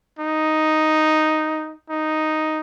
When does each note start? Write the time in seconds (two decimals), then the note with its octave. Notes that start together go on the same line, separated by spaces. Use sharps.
0.19 D#4
1.90 D#4